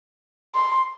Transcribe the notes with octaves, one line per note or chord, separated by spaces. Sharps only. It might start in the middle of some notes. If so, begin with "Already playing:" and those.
C6